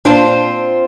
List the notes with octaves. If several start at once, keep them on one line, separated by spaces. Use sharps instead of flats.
A#2 C4 D4 F4 C5